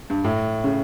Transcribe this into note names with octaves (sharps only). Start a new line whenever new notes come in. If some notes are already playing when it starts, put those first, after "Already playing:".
G2
A2
C#3